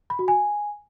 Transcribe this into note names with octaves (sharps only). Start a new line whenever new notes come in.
B5
F#4
G#5